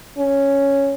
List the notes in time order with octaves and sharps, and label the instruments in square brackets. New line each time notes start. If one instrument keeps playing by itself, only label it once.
[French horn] C#4